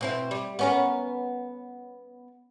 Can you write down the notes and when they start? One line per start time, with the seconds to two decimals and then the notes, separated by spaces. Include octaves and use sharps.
0.01 B2 C4 E4
0.31 G3
0.59 B3 C#4 A#4